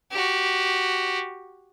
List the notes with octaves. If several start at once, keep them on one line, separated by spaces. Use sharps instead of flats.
F#4 G4